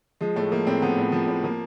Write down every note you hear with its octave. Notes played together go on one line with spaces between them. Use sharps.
F3 G#3
A2 A3
F3 A#3
A2 C4
F3 B3
A2
F3
A2
F3 A#3